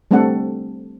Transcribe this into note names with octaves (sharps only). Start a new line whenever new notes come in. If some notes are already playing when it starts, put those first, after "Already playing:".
G3 A3 C4 D4 A4 F#5